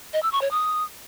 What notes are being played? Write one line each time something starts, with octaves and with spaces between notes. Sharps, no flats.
D#5
E6
C#6
C#5
D#6